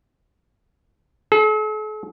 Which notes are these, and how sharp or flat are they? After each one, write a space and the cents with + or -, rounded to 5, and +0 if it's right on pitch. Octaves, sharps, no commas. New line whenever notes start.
A4 -45